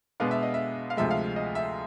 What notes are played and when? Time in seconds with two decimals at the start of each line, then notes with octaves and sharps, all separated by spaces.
0.20 B2 G#3 B3 D4 F5
0.31 E5
0.43 D#5
0.54 E5
0.90 F5
0.97 D2 C3 F3 G#3 E5
1.11 F5
1.36 D#5
1.55 E5